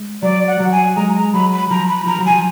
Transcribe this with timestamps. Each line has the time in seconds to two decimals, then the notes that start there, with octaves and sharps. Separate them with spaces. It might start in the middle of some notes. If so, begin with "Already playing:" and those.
Already playing: G#3
0.23 F#3 D5
0.47 F#5
0.60 F#3
0.72 G#5
0.96 G#3 A#5
1.15 A#5
1.33 F#3 B5
1.52 B5
1.70 F3 A#5
1.89 B5
2.06 F3 A#5
2.19 F#3
2.26 F3 G#5